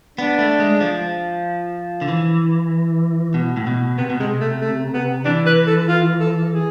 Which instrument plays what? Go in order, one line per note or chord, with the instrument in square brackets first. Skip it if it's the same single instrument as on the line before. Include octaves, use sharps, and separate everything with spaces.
[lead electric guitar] B3 [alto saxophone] D4
[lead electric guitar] A3
G#3
F3
D3
E3
B2
A2
B2
[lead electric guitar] C3 [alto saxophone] B3
[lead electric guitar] B2
[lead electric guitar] C3 [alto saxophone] G#3
[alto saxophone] A3
A3
B3
[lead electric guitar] E3 [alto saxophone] D4
[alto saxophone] B4
A4
F4
A4
G#4